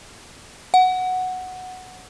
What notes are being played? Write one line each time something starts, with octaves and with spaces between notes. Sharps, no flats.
F#5